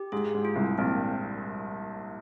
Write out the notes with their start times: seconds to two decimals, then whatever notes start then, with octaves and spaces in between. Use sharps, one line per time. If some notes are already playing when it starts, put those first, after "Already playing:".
Already playing: G4
0.12 G#2 G#4
0.35 G#2
0.45 F4
0.56 C2 C3
0.78 A#1 A#2 C4